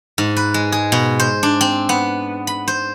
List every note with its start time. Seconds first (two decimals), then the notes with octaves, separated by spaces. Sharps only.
0.18 G#2
0.36 B4
0.54 G#3
0.72 G#4
0.92 B2
1.19 C5
1.43 D4
1.61 C4
1.89 B3
2.47 B5
2.68 C5